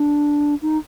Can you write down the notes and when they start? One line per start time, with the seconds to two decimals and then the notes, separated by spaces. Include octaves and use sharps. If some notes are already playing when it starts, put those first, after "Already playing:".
Already playing: D4
0.61 D#4